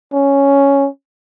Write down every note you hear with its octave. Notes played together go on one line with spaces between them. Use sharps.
C#4